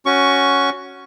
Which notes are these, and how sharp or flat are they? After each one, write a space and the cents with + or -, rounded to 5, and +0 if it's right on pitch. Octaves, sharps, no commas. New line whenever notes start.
C#4 +5 F#4 +0 C#6 +10